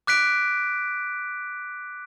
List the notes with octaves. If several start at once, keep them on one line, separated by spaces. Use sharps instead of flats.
D6 F#6 B6 D7